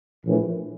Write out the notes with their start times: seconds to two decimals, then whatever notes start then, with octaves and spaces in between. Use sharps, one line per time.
0.24 A#1 A2 E3